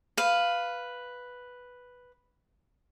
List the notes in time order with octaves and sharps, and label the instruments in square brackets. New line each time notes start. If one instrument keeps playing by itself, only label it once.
[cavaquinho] B4 F5